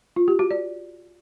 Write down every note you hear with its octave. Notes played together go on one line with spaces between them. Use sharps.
F4
G4
F#4
D5